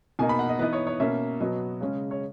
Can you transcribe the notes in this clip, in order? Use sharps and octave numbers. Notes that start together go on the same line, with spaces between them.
B2 A#3 D#4 G#5
B5
F#5
D#5
E3 B3 D#4 B4
C#5
C#5
B2 A#3 C#4 E5
B2 F#3 B3 D#5
C#3 G#3 C#4
C#5